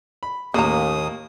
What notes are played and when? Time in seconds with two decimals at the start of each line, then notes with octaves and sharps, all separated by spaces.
0.23 B5
0.54 D#2 A2 C#3 A#3 A#5 D#6